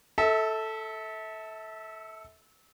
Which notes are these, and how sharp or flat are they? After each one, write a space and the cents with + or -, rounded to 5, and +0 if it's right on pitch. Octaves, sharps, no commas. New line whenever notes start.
A4 +0 E5 -30